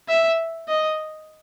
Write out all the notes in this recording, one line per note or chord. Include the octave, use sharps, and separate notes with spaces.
E5
D#5